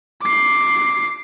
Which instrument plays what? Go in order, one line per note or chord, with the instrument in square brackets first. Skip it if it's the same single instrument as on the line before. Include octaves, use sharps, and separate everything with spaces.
[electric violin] D6 C7